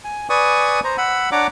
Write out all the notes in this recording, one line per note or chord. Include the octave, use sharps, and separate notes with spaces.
G#5
B4 D5 G#5 C#6 D#6
C5 A#5
F#5 B5 E6
D4 C#5 D5 F#5 A#5 D6